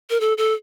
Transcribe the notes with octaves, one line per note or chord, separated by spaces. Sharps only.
A#4
A4
A4